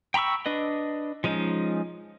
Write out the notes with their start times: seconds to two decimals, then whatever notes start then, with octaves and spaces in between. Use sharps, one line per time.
0.14 G5 A#5 B5 C#6 E6
0.46 D4 B4 D#5
1.24 F3 G#3 C#4 D#4